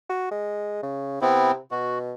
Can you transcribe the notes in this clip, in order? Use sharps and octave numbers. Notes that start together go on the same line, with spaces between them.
F#4
G#3
C#3
C3 B3 C4 E4
B2 F#4